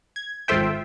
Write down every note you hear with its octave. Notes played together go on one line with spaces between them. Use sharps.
G#6
G#1 F4 A4 C5 E5 G5